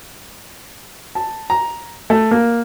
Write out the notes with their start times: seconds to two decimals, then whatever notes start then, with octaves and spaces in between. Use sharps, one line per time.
1.15 A5
1.50 A#5
2.10 A3
2.31 A#3